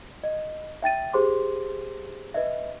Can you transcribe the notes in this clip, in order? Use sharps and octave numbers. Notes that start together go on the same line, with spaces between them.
D#5
E5 G5 A6 D#7
G4 G#4 C5 C6 D6
B4 D#5 E5